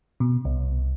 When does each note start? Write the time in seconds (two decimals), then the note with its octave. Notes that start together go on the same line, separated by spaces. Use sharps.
0.20 B2
0.45 C2